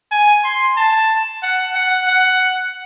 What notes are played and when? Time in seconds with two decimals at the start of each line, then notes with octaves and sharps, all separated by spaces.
0.11 G#5
0.44 C6
0.77 A5
1.43 F#5
1.75 F#5
2.07 F#5